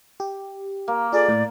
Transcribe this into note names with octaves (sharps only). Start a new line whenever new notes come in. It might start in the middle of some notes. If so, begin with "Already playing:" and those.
G4
A#3
F4 G#4 A4 D5
A2